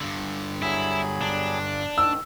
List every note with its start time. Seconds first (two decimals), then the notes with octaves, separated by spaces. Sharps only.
0.01 G2 D3
0.62 F#3 E4 G#4 B5
1.21 D4
1.98 G#2 D#3 E6